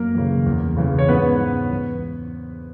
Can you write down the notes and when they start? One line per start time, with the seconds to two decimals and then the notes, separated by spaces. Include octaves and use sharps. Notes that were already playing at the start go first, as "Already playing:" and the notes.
Already playing: F#2 A#3 A#4
0.15 C#3 E3
0.46 E2
0.77 C#3 E3
0.99 C#5
1.09 G#2 B3 B4
1.40 E3
1.72 E2